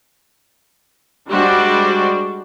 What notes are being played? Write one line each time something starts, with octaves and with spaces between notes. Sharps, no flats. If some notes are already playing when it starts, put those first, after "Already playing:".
G3 G#3 D4 F#4 C5 D5